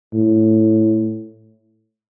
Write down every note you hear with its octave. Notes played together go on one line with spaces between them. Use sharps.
A2